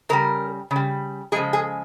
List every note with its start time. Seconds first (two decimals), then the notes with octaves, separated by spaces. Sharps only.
0.09 C#3 G3 A#4
0.71 C#3
0.76 G3
1.32 C#3 F3 G#3 G#4
1.53 G#4